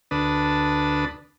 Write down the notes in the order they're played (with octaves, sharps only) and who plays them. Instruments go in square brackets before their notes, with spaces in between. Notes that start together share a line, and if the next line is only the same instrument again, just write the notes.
[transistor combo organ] D2 D4 B4 A5 D#6